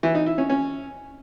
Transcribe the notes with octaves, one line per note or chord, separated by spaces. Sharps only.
E3
D#4
E4
C#4
C#4